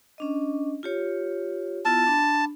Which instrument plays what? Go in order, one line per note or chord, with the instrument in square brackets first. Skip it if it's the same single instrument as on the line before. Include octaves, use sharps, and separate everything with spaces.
[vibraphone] C#4 D4 D#5
F4 G4 C#5
[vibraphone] B3 E4 F4 [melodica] A5
[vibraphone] D4 B5